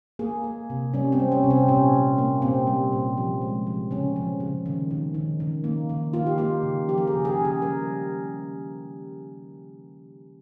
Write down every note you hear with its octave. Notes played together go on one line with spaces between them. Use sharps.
A#3 G#4
A#3
C3
G3 C#4
C4
G3
C#4
C3
C4
A#2 C#4
G3
A#3
A#2 C4
G3
A#2
F3
G#3
F3
C#3 C#4
F3
C#3
D#3
D#3
D#3
D#3
A#3
D#3
A#3 F4
G4
A#3 F4
C#3
F3 G4
A#4
G#4
C#3
G#4
C#3
G#4
G3 A#4